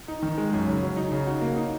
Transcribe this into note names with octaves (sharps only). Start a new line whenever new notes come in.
D#4
D#3
G#3
F#2
C#3
F#3
D#4
C#3
F#4
A#3
D#4